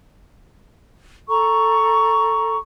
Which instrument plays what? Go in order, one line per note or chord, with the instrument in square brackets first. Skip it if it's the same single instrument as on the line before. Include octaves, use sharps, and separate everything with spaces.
[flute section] A4 A#5 C#6